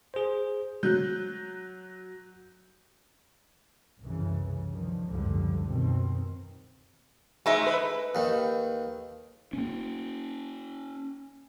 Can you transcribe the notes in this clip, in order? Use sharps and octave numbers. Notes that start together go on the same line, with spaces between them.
G#4 C5
F#3 F#6 G6
C2 F#2 C#3 E3
D3 D#3 F3
C#2 F#2 A2 D3 F3 G3
F#2 B2 D#3 C4
G#3 A3 D#4 E5
B4
D#2 D#3
A#3 C#4